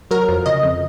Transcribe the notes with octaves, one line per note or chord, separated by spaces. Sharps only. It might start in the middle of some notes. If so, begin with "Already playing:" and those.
F#3 A#4
F2
C#3 D#5
F2